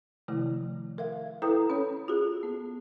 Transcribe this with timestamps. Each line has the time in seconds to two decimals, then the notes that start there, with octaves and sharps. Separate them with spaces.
0.28 C3 D#3 F3 A3 E4
0.98 A#4 E5 F5
1.42 E4 A4 B4 G5 A#5 D#6
1.70 C#4 A4 C#5
2.08 F4 F#4 G#4
2.43 B3